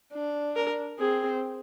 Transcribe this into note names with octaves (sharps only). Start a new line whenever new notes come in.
D4
A#4
C4 G#4